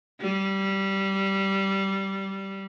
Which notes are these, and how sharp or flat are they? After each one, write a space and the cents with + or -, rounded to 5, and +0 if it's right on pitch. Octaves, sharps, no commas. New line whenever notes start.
G3 -15